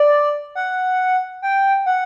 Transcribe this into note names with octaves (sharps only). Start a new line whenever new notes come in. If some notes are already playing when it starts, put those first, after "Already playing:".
Already playing: D5
F#5
G5
F#5